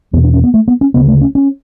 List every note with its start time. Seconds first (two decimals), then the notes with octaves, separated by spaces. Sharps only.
0.13 E2 B3
0.17 B2
0.24 D4
0.34 C#4
0.44 B3
0.54 A3
0.68 B3
0.81 C#4
0.94 D2 C#3 B3
1.08 A3
1.21 C#4
1.35 C#4